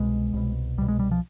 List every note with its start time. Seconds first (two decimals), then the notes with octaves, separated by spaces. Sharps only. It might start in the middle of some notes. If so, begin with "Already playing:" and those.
Already playing: C2 B2 G#3
0.33 C2 B2
0.78 C2 G3
0.81 B2
0.88 G#3
0.99 G3
1.11 F3